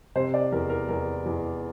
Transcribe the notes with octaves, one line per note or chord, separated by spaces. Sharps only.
C3 C5
D5
E2 A#4
A#4
E2 A#4
E2